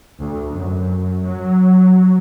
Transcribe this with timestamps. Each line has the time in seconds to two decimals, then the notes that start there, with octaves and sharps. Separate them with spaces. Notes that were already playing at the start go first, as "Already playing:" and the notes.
0.20 D2
0.53 F#2
1.23 F#3